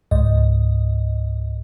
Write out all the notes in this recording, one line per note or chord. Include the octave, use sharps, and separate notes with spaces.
C#2 G#2 D#5